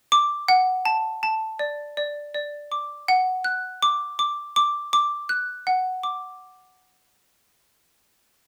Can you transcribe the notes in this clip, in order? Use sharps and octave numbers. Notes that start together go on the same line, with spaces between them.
D6
F#5
A5
A5
D5
D5
D5
D6
F#5
F#6
D6
D6
D6
D6
F#6
F#5
D6